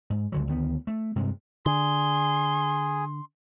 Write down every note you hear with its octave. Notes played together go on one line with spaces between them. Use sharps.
G#2
C#2 D3 F#3
D2 D#3 B3
A3
G2 C3 G#3
D3 G#4 C6